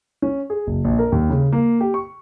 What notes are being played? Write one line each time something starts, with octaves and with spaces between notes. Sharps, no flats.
C#4
G#4
F#1
A#1
A#4
D#2
C#3
A#3
G4
C#6